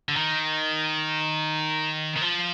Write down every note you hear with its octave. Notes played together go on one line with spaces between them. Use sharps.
D3
D#3
D#3
F3